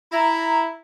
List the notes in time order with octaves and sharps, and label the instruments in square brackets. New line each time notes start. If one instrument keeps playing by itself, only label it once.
[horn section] E4 [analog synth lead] A#5